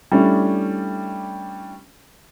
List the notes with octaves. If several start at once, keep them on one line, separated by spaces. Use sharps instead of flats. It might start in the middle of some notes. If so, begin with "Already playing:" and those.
G3 A3 C#4 D4 E4